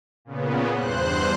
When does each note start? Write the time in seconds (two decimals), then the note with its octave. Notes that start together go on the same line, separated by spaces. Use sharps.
0.25 A#2 C#3 B3
0.73 E2 G2 C5 F#6